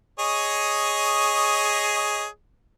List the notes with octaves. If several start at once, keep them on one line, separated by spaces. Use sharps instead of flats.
G#4 C#5 D#5